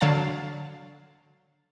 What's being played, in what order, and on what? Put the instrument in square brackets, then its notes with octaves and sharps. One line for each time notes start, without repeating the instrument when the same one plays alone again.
[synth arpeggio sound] D3 F#3 F5 A5 A6